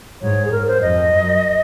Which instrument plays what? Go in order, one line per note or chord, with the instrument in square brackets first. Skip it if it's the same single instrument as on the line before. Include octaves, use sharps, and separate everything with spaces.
[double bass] G#2 [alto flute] C#5
[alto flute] G#4
[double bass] G#2 [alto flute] A#4
[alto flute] C5
[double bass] F2 [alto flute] D#5
[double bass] F#2